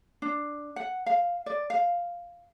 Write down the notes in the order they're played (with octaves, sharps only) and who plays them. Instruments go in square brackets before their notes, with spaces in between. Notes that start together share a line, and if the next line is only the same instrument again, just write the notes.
[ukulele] D4
F#5
F5
D5
F5